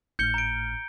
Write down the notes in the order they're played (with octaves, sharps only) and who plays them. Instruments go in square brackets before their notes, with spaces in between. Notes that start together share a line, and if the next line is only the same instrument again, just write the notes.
[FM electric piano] G#1 A2 F6 [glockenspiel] G6 C#7 G7
[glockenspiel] A#5 D7